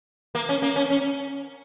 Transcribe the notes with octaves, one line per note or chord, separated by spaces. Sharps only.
A#3
C#4
A#3
C#4
C#4